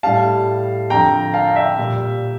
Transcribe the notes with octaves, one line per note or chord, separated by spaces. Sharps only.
A2 G3 F5 A5
F2 D3 F3 G5 A#5
F5 A5
F5
E5 G5
A#2 G3